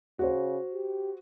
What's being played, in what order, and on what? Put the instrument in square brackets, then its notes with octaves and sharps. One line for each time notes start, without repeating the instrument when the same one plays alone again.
[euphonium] C#3 [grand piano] F#4 C5
[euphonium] G4